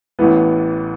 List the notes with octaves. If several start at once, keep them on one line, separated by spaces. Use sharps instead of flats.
A1 A2 E3 B3